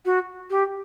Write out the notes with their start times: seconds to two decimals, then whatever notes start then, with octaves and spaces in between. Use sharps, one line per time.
0.05 F#4
0.50 G4